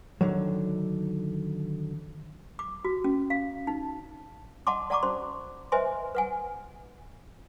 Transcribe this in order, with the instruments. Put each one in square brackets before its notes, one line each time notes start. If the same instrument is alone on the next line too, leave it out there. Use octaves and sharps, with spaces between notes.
[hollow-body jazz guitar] D3 D#3 F#3
[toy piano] D6
F#4
C#4
F5
D#4
D#5 F#5 A5 C6 D6
D5 F#5 A5 A#5 C#6 D6
C#4 F#4 C5 C6
B4 C5 D#5 E5 G#5 C6
B4 F#5 G#5